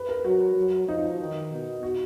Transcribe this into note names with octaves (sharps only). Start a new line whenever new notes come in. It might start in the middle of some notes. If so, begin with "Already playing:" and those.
Already playing: B4
A#4
F#3 F#4
F#3
F3 D#4
D#3
B2
F#4